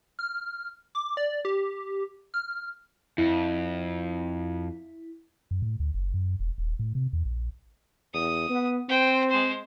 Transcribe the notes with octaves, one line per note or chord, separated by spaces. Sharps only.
F6
D6
D5
G4
F6
F2 E4
F#2
A2
D2
F#1
F#2
E1
D#1
A2
C3
E2
A#1
E2 D#6
B3
C4 C5 G5
G#3 C5